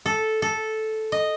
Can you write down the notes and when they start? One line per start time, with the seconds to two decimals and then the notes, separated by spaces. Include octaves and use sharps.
0.06 A4
0.42 A4
1.12 D#5